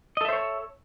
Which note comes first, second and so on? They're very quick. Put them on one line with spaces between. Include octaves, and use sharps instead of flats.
D#5 A4 E5 C5 C#5